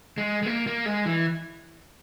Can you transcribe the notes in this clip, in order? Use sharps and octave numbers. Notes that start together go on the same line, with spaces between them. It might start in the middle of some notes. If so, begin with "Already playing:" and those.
G#3
G#3
A#3
A#3
G#3
E3